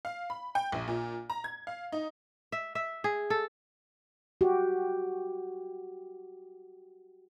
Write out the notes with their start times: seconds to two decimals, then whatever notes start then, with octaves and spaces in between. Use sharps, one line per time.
0.05 F5
0.30 B5
0.55 G5
0.72 A#1
0.87 A#2
1.30 A#5
1.44 G#6
1.67 F5
1.92 D#4
2.52 E5
2.75 E5
3.04 G#4
3.30 A4
4.41 F#4 G4